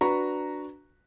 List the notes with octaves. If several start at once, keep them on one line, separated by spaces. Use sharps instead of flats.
D4 F#4 B4 A#5 C#6